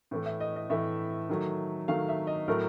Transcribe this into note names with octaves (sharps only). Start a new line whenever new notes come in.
A2 E3 A3
E5
D#5
D#5
A2 E3 A3 E5
D#3 F#3 A3
D#3 F#3 A3 F5
E5
D#5
A2 F#3 A3 A#4